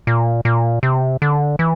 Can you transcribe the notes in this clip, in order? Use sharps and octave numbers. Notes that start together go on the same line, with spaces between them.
A#2
A#2
C3
D3
E3